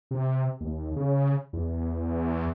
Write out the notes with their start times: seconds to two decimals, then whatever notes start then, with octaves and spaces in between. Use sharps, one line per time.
0.11 C3
0.61 D#2
0.96 C#3
1.53 E2